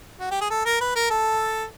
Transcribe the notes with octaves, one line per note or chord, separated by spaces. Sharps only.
F#4
G4
G#4
A4
A#4
B4
A#4
A4